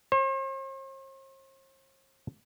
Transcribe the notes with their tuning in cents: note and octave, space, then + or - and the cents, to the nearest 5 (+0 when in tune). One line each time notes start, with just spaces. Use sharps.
C5 +45